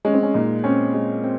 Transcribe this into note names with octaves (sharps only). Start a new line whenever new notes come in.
G#3 C#4
C4
C#4
A#2 D#4
C4 C#4
G#3
C4